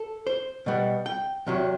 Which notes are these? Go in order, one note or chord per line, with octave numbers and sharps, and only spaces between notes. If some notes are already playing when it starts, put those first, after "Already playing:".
Already playing: A4
C5
B2 G3 B3
G5
E2 C3 F#3